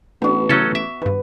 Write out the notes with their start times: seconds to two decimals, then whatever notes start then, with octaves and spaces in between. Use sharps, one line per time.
0.22 A1 A3 B3 D4 F#4
0.49 C#3 F#3 C#4 E4 A4 B6
0.75 E5 D6
1.02 G2 D#3 B4